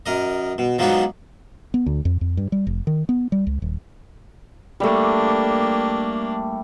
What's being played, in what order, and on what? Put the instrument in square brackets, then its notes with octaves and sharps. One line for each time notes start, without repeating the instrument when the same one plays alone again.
[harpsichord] F#2 A#4 D#5
B2
F3 F#3 G#3 B3 D4 D#4
[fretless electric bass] B3
D2
F2
F2
G2
G3
F1
D#3
B3
G3
C#2
D#1
[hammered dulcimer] G3 A3 [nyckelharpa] A#3 D4